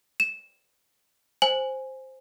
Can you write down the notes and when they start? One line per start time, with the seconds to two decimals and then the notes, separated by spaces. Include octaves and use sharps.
0.20 E7
1.42 C5 G#5 F#7